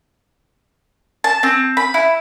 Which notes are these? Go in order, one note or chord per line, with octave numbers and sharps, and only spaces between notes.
A5
C4
B5
E4